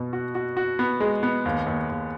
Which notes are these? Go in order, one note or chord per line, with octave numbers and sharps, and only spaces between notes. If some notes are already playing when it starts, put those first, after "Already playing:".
Already playing: B2 B3
F#4
F#4
F#4
B3
G#3
B3
D#2
D#2
D#2